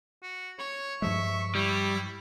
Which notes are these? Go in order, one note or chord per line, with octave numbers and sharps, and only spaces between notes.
F#4
C#5 C#6
G2 F3 G#3 E5
G3 E4